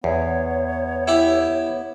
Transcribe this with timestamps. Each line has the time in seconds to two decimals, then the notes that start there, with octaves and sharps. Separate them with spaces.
0.04 E2 B3 C#5
1.07 E4 G4